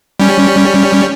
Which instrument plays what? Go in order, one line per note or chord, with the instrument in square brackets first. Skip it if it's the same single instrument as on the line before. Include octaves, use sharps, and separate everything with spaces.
[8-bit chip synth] G3 C#4